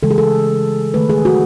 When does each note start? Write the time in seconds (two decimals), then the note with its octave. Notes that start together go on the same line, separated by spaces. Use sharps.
0.03 C#3 E3 G#3 A4
0.10 G#4
0.18 A4
0.94 D#3 A3 B4
1.09 G#4
1.25 F#4